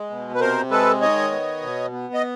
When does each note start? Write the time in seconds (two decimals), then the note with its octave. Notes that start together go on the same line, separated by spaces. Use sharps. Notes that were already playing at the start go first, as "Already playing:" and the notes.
Already playing: G#3
0.10 B2
0.35 B4
0.40 C3 A#4 C5
0.71 G#3 A4 B4
1.01 D#3 C#5 D#5
1.31 B3
1.62 B2
1.92 B3
2.14 D#5